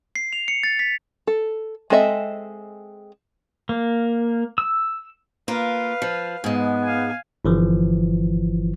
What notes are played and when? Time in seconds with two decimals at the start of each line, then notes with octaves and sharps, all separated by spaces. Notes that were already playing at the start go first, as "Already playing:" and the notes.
0.16 C7
0.33 F7
0.48 C#7
0.63 A6
0.79 B6
1.27 A4
1.90 G#3 C4 A4 D#5 E5
3.69 A#3
4.58 E6
5.48 A#3 F4 B4 F5
6.02 F3
6.44 G#2 G#3 B3
6.83 F5 G#5
7.45 G1 E3 F3